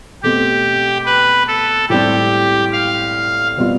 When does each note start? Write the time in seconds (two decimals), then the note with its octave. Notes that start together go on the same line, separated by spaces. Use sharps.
0.23 B2 A3 C4 G4
1.06 B4
1.48 A4
1.90 A2 G3 C4 G4
2.73 F5
3.57 B2 G3 C4 F4